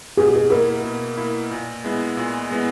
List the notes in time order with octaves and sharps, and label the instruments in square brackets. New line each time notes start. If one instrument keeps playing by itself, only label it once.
[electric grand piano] B2 [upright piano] G#4
[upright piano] F#4
G#4
[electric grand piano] A#3 E4 [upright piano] A#4
[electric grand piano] B2
A#3 E4
A#2
G#3 B3 E4
A#2
G#3 B3 E4